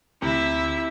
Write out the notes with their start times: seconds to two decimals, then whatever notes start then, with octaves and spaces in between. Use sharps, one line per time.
0.22 D2 C3 E4 E5